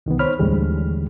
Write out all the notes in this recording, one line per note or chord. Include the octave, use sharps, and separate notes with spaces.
C2 D#3 E3 B3
C5 C#5 B5 F6
D#2 A2 D3 E3 G3 G#3